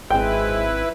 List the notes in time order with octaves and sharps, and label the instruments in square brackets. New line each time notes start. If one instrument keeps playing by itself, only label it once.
[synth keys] G#1 C4 [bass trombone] G#3 [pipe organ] E4 B4 [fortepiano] G5